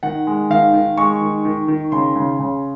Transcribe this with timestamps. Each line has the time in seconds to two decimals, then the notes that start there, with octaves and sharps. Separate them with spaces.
0.03 D#3 F#5
0.27 G#3
0.50 D#3 F5
0.73 D#3
0.97 G#3 C#6
1.21 D#3
1.45 D#3
1.68 D#3
1.92 C#3 C6
2.16 C#3
2.39 C#3